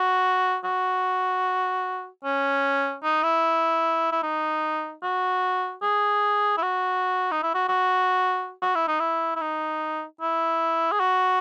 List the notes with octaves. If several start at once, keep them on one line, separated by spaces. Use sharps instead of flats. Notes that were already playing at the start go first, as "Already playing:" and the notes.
Already playing: F#4
F#4
C#4
D#4
E4
E4
D#4
F#4
G#4
E4
F#4
D#4
E4
F#4
F#4
F#4
E4
D#4
E4
E4
D#4
E4
G#4
F#4